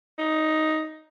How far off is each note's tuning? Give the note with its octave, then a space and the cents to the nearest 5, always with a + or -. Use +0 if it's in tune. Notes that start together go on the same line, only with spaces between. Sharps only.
D#4 +5